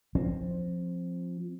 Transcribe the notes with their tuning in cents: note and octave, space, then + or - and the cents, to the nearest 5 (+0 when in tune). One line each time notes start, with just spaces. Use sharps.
F3 +0 C4 +10